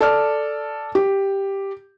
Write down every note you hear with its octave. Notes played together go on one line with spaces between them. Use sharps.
A4 D5 F6
G4